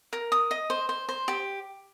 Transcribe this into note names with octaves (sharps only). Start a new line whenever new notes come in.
A#4
D#6
D#5
C5
C5
C5
G4